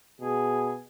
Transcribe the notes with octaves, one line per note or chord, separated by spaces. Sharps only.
B2 G#4